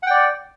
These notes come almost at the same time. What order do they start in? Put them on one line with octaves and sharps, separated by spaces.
F#5 G5 D5